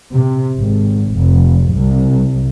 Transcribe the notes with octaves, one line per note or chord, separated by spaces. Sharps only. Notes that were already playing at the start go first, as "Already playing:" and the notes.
C3
G#1
F1
C2